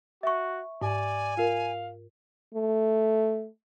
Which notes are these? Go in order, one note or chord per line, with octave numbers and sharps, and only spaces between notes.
F#4 E5 C#6
G#2 D5 G#5
F4 A#4 F5
A3